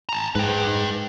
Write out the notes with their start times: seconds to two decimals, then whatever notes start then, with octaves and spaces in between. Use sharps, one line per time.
0.09 A5 A#5
0.35 G#2 B4 G5